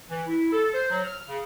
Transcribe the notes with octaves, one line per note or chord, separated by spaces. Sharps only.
E3
E4
A4
C5
F#3
F6
C#3